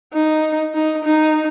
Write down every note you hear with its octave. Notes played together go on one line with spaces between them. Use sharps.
D#4
D#4
D#4